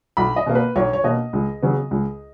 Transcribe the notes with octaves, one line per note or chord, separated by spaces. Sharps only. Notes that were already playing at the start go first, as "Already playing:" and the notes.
B1 B5
D#5
B2 A#3
B4
B1 C#5
C#5
B2 A#3 D#5
C#2
C#3 F#3 B3
C#2